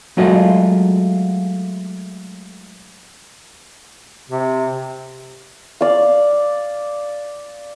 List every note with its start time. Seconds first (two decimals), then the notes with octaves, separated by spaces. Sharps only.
0.17 F#3 G#3 A3 F4 F#4 D#5
4.30 C3
5.81 D5 F5